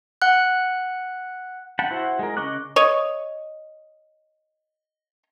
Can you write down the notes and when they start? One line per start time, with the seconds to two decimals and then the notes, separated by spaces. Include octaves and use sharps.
0.22 F#5 F#6
1.79 F#5 G5 A5 B5
1.91 E4 F#4 C5 F#5
2.19 G#3 A#4
2.37 C#3 D#5 C#6 D6 F#6
2.76 C#5 D#5